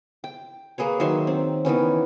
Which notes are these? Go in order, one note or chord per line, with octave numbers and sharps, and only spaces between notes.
G5
A#3 G#4 B4 C#5
D#3 F#3 E5 C6
C4
D#3 E3 B3 C#4